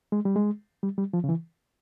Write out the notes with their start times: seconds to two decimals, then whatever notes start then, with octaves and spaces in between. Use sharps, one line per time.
0.12 G#3
0.25 G3
0.36 G#3
0.83 G3
0.98 G3
1.13 F3
1.24 C#3
1.29 E3